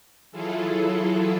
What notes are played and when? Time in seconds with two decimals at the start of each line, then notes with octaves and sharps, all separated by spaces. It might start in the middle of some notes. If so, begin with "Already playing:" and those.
0.32 E3 F#3 E4 F4 G#4 A4